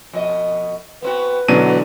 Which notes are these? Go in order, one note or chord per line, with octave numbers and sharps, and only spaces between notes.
F2 B2 D#5
B3 C4 F#4 B4
B2 D3 E3 F#3 G#3 D4 D#7